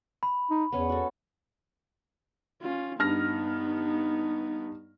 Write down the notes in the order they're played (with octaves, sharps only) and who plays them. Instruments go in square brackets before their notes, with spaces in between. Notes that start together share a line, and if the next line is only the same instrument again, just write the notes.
[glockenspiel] B5
[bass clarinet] D#4
[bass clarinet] E2 [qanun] B3 C#4 C#5
[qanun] F#4 A4
[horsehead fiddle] C#4 F4
[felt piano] G2 F6 A#6 [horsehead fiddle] B3 D#4